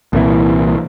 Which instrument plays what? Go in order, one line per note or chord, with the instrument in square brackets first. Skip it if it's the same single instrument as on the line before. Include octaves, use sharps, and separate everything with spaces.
[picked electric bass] C2 A#2 E3